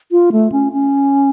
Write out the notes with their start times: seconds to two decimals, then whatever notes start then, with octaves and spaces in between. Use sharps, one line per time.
0.12 F4
0.32 A3
0.52 C#4
0.73 C#4